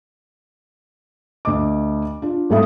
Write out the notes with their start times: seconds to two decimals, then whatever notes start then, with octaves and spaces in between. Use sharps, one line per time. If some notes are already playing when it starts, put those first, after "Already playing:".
1.45 D2 D#5 D6
2.22 D4 F4
2.50 G#1 A2 G3 A4 E5 D#6